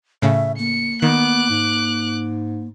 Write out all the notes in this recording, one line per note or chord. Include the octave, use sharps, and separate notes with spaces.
A2 C#3 E5
A#3 C#7
D#3 B3 D6 F#6
G#2